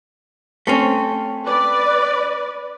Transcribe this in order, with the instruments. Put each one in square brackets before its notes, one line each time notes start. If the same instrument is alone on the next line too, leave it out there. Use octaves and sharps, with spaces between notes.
[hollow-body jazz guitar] A3 C4 C#4
[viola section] B4 D5